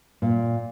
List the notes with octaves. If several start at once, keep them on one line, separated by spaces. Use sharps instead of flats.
A#2